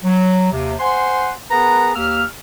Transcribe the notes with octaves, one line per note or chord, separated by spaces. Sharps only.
F#3
D#2 C3
C5 F#5 G#5 C6
B3 G#4 A#4 B4 F#5 A#5
D#2 A#3 G4 E6 F6